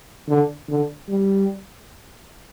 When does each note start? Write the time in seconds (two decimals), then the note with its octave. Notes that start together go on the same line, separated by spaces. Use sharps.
0.29 D3
0.69 D3
1.09 G3